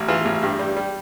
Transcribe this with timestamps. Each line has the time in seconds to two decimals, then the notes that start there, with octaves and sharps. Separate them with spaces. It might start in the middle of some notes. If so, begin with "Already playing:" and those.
Already playing: A1
0.08 E3 F4
0.25 A1
0.43 G2
0.59 G3
0.77 G3